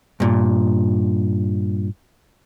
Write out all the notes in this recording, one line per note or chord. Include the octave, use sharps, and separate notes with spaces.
G2 A#2